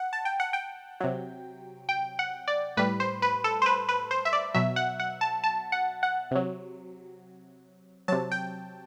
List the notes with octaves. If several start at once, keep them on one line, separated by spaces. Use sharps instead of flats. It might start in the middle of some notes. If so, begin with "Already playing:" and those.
Already playing: F#5
A5
G5
F#5
G5
C3 F#3
G5
F#5
D5
A2 G3 B4
C5
B4
A4
C5
B4
B4
C5
E5
D5
B2 F#3 E5
F#5
F#5
A5
A5
F#5
F#5
C3 F#3
C3 F#3 A5
G5